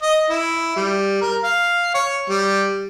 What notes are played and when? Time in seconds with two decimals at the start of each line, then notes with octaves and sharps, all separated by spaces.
0.02 D#5
0.30 E4
0.76 G3
1.21 A#4
1.44 F5
1.94 C#5
2.29 G3